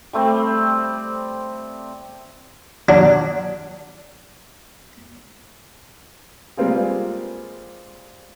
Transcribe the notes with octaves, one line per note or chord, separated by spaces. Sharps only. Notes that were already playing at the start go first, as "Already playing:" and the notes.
G3 A3 C4 D5
F#3 D4
G3 G#3 A#3 C4 F4 G#4